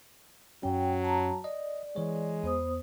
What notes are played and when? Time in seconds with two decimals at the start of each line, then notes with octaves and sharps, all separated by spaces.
0.63 F#2 F#3 C#4 G5
1.03 A5 A#5
1.44 D5 D#5
1.96 E3 G#3 C#5
2.43 E2 B3 C5 D#6